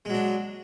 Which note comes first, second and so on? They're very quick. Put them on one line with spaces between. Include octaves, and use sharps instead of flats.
G#3 F#3 D4